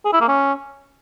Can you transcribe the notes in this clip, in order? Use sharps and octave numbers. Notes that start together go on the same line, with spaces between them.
G#4
E4
A#3
C#4